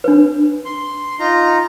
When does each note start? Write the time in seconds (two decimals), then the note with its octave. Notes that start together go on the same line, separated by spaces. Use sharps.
0.04 D4 B4
0.65 C6
1.20 D#4 F4 A#5